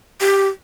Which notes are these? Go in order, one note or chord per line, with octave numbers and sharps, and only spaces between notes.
G4